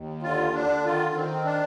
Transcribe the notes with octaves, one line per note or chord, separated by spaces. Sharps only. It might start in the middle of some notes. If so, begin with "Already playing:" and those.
Already playing: D#2
D3 F4
D3 D4
D#3 F4
D#3 C4
D4